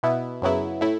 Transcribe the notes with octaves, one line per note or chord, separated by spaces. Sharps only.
B2 B3 E4
F#2 C#3 F#3 B3 E4
A2 A3 E4